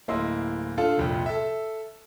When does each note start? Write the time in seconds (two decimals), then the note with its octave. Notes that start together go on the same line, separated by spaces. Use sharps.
0.08 D1 A#3 E4 D#5 C6 E6
0.78 D4 F4 A4 F5
0.97 C2 F2 A#2
1.26 A4 E5